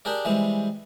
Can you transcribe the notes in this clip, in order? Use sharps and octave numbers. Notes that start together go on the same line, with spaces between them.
D4 G4 G#4 A#4 D5
E3 G3 G#3 C4